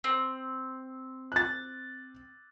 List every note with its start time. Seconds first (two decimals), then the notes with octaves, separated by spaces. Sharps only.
0.04 C4
1.32 F#6 A6